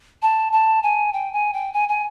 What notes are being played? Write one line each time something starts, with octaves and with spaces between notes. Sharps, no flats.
A5
A5
G#5
G5
G#5
G5
G#5
G#5